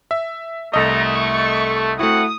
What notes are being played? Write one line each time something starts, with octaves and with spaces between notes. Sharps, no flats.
E5
C2 A3 D#5 A#5
C#6
A3 C4 E4 F#4 F#5 D#6